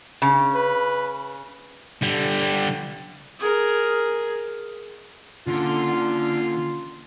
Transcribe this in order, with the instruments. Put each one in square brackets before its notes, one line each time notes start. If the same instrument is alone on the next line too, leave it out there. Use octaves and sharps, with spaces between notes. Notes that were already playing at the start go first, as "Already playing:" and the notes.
[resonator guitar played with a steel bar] C#3
[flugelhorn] B4
[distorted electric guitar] D3 G3
[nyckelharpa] G#4 A#4
[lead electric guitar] D3 [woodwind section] A#3 C#4 F4